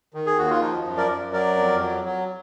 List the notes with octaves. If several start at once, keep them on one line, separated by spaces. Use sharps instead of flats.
D#3
G#4
D#2 F#4
F4
F3 D#4
F#2
A#4 D5
F#2
F#3 A#4 D5
F2
F#3
F#3